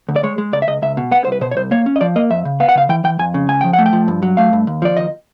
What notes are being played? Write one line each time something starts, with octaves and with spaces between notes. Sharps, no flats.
D2
D5
G#3 C#5
G#3
C#2 D5
E5
C#2 D#5
C#2 E5
B2
B3 F#5
C2 C5
B4
B2 C5
C#5
C2 C5
A#3 C#5
C#4
D#5
F3 D5
A#3 D#5
F2 E5
C#3
B3 F5
F#5
C#3 F5
E3 G5
E3 G5
F2 G#5
C#3
C#2 G#5
F3 G5
F#5
A3
G5
F3
G2
F#3
A3 F5
G2
D#2
F3 D5
D#2 D#5